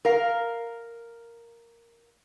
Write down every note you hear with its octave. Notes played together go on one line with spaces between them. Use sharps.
A#4 F5